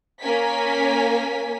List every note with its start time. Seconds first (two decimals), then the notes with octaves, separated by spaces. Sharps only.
0.22 A#3 C#4 A#4 G#5 B6